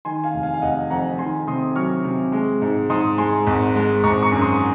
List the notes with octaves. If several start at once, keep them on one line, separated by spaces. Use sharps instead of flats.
D#3 G#5 C6
F5 G#5
F1
F5 G#5
F5
F1 D#5 F#5
F2 F#5 A#5
D#3 G#5 C6
C3 C6 D#6
F#3 C#6 F6
C3
G#3
G#2
G#2 C6 D#6
G#3 G#5 C6
G#1
G#3
G#1 A#5 C#6
A#5 C#6
F#2
C6 D#6